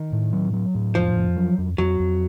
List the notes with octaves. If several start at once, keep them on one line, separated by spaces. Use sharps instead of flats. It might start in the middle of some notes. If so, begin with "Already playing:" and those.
Already playing: D#3
A2
F#3
F#3
A2
F2 F3
F2
F#3
F2
F2 F#3
F2